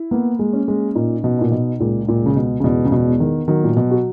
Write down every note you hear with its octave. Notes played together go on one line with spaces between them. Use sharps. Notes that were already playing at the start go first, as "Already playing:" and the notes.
Already playing: E4
A#3 B3
G#3
C#4
G#3
A#2 D#4
B2
A#2 D#4
B2
C#2 A#2
A#2
C#2 C#3
B2
C#3
E2 B2
C#3
B2
B3
D#3
D#3 F#3
A#2
B2
F#4